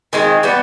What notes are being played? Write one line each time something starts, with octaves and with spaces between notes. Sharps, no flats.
D#3 G#3 C4 F4
E3 G3 B3